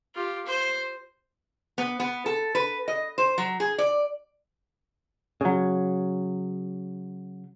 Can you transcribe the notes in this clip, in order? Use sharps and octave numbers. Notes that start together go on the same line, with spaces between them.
F4 G4
C5
B3
B3
A4
B4
D#5
C5
F#3
G#4
D5
C#3 F#3